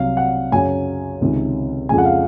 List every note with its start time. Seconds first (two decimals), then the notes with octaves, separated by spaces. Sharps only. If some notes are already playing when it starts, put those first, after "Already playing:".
Already playing: C2 C3 F#3 F5
0.17 F#5
0.52 F#2 C#3 F#3 G#5
1.21 C#2 C3 D#3
1.89 F2 C#3 F3 G#3 G#5
1.98 F#5
2.05 F5